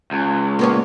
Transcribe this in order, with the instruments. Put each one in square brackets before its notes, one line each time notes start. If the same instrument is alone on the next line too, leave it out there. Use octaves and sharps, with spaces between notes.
[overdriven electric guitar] C#2
[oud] A#3 B3 C#4